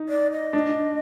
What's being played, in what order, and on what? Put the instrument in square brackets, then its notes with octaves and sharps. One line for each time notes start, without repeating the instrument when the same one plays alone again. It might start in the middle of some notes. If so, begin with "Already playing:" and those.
Already playing: [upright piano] D#4
[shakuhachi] D5
D#5
[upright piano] D4